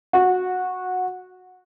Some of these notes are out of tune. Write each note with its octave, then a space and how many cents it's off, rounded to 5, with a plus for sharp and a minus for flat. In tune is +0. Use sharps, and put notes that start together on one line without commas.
F#4 -15